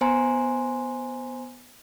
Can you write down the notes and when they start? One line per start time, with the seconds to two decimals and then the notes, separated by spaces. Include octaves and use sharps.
0.01 B3 C5 G#5 A#5 C6